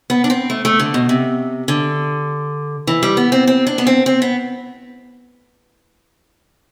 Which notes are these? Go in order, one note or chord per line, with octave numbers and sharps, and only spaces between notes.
B3
D4
C4
A3
A3
D3
B2
C3
D3
E3
G3
B3
C4
C4
D4
B3
C4
C4
B3